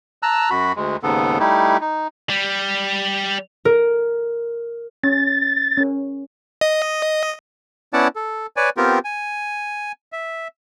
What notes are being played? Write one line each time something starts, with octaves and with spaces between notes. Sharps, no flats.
A5 A#5 E6 F#6
F#2 F#4 B5
D2 G#3
D#2 G#2 C#3 B3 A4
G3 A3 D#4 E4 G4
D#4
G3
A#4
C#4 A6
C#4 A#4
D#5
B3 C#4 E4 D5 F#5 A5
A4
B4 C#5 D5 G#5
B3 C4 F4 G4 A#4
G#5
E5